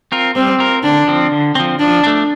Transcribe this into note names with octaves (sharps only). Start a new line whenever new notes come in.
C4 F4 A#4
G3 C4
C4 F4 A#4
D3 D4
F3 C4
D3
F3 C4
F3 D4
A3 D4